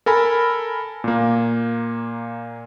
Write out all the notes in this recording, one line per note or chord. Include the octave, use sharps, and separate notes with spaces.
A4 A#4 G#5 B5
A#2 A#3